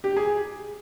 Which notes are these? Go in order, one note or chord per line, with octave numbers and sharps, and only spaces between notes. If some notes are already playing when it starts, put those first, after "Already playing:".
G4
G#4